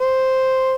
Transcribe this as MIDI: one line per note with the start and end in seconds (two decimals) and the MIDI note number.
0.01 0.74 72